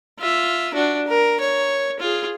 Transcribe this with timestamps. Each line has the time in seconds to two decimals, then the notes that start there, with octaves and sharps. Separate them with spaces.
0.19 F4 E5
0.74 D4 F#4
1.07 A#4
1.40 C#5
1.99 F4 G#4